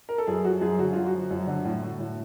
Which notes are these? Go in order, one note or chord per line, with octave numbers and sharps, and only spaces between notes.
A#4
A4
F#2 G#4
F3 F#4
F#2 G#4
D3 F#4
F#2 F4
F#4
F3
F#2
D3
A2
A3
A2